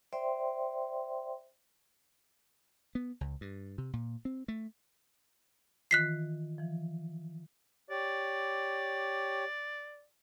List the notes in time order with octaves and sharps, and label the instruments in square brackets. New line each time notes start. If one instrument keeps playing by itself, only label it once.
[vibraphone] C5 D5 E5 G5 C6
[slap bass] B3
C#2
G2
C3
A#2
C4
A3
[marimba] D#3 E3 F4 [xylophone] F#6 B6 C7
[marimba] E3 F3
[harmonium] G4 C#5 [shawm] D5